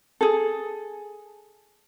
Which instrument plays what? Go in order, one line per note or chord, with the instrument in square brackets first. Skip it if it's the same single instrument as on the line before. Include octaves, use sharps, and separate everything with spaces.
[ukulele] G#4 A4